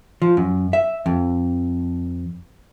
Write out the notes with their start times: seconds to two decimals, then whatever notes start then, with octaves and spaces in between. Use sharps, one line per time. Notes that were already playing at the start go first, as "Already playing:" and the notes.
0.22 F3
0.37 F#2
0.73 E5
1.06 F2